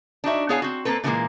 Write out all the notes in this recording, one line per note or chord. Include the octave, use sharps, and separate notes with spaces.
D4 D#4 F#4 E5
B3 E4 G#4 C#5 F5 G#5
C4 F#4
A#3 C4 A4 B4
A#2 D3 E3 F3 G#3 A#3